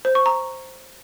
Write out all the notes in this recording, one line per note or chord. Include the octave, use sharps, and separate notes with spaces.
C5
C#6
A#5